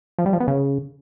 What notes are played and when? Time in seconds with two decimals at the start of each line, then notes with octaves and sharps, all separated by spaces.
0.19 F3
0.26 G3
0.33 F3
0.40 B3
0.48 C#3